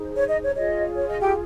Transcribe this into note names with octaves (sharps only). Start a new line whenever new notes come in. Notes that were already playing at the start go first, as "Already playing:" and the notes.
Already playing: D#4 G#4 C5
C#5
D#5
C#5
F4 G#4 C#5 D#5
C#5
D#5
G4 G5